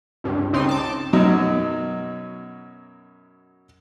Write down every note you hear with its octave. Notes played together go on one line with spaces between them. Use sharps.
C#2 G2
C#2 C#3 C4 D#4 C6
A5 D6
F#2 B2 F#3 D#4